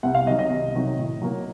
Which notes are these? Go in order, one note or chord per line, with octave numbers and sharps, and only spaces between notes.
C2 F#5
F5
C3 D#3 F#3 D#5
D#5
C2
C3 D#3 F#3
A2
F#3 A#3